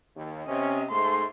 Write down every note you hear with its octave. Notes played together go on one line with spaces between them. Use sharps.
D#2
C3 C#4 D#5
G#2 A3 C6